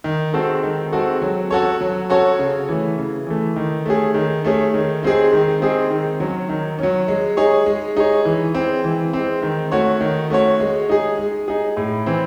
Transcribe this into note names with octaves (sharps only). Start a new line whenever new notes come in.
D#3
G#3 C4 F#4 A4
D#3
G#3 C4 F#4 A4
F#3
C#4 F#4 A4 C#5
F#3
C#4 F#4 A4 C#5
C#3
E3 A3
C#3
E3 A3
D#3
A3 C#4 G#4
D#3
A3 C#4 G#4
D#3
G#3 C4 D#4 G#4
D#3
G#3 C4 D#4 G#4
D#3
F#3 C#4
D#3
F#3 C#4
G#3
D#4 G#4 C#5
G#3
D#4 G#4 C#5
E3
G#3 C4
E3
G#3 C4
D#3
A3 C#4 F#4 C#5
D#3
A3 C#4 F#4 C#5
G#3
D#4 G#4
G#3
D#4 G#4
A2
E3 C4